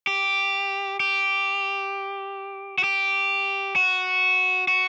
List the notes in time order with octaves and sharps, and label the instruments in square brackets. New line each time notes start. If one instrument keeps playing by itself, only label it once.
[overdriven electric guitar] G4
G4
F#4
G4
F#4
F#4